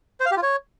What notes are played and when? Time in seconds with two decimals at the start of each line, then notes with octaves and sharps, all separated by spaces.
0.20 C5
0.26 F5
0.32 G4
0.37 F4
0.43 C#5